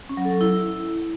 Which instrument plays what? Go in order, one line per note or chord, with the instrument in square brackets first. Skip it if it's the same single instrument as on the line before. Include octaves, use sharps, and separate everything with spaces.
[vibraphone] C#4
F#3
A4
F#3
E4